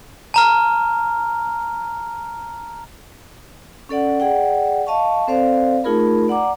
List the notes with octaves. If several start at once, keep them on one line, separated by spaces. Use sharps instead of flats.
A5 A#5 F6
C#4 A4 D5 F#5
G#4 D5 F#5 G5
D#5 F5 A5 C#6
C4 A4 C5 D5 F5
A3 D#4 F4 G#4 A#4 B5
D5 F#5 A#5 D6